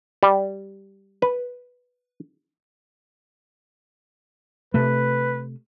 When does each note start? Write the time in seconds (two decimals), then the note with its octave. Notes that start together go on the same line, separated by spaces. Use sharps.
0.23 G3
1.22 B4
4.74 C3 A3 B4